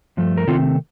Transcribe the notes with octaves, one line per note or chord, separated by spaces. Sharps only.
G2 F3 A3
A#4
C3 D#3 A3 C4 F4 A4